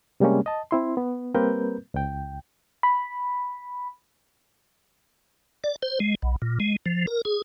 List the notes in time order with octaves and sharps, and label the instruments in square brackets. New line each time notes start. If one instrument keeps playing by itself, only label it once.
[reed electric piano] C3 G3 G#3 A#3 C#4
D#5 A5
C4 E4 C6
B3
G3 A#3 C4 A#4 B4 G6
C#2 G5
[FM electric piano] B5
[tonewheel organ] D5
C5
G#3
B1
A#2
G#3
F3
A#4
G#4